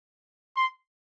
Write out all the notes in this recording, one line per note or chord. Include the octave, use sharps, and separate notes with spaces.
C6